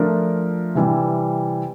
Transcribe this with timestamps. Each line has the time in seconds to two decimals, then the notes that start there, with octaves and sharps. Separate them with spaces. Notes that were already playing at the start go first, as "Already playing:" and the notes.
Already playing: F3 A3 D4 F4 A#4
0.75 C3 E3 G3